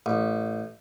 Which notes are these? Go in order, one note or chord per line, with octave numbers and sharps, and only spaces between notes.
A1